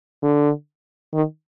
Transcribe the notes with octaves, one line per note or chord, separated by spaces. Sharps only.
D3
D#3